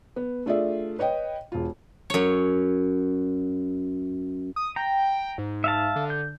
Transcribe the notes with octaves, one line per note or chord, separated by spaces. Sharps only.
B3
A3 D4 F4 G#4 D5 E5
B4 C#5 D#5 G5
E1 F4
F#2 C#5
D#6
G5 A#5
G#2
E5 F5 A5
D3
G6